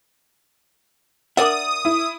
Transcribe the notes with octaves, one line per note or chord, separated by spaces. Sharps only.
D4 A#4 D5 E5 F#5 D#6
E4